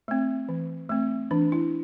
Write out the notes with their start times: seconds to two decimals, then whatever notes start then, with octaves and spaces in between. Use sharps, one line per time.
0.08 A3 C4
0.49 E3
0.89 A3 C4
1.31 E3 D4
1.52 E4